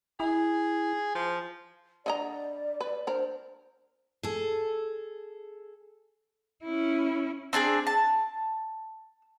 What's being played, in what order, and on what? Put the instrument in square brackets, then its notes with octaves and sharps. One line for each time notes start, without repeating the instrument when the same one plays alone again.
[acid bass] E4 [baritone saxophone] G#4
[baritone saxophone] F3
[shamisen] D3 D#5 A#5 [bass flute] D5
[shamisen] B4
[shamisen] D4 A#4 [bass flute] C5
[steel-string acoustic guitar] G#4 A4
[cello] C#4 E4
[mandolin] C4 D4 G#4 D5
A5